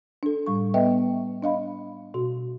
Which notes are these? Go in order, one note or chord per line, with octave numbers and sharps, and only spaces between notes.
D4 A4
A2 G3 C#6
B3 B4 D#5 E5 G5
D4 D#5 F5 B5
B2 F#4